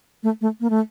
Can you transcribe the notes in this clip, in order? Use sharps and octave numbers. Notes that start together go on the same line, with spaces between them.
A3
A3
A#3
A3